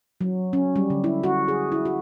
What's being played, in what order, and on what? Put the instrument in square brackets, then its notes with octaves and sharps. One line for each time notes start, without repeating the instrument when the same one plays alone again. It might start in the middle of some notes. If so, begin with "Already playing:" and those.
[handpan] F#3
C#4
G3
D3
E4
F#4
G#4
E4
F#4